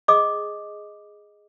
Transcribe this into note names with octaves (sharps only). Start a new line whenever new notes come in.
G#4 D#5 D6 D#6